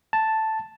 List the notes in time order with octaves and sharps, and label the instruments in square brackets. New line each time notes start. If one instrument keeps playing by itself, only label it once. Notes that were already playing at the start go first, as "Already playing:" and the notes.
[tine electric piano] A5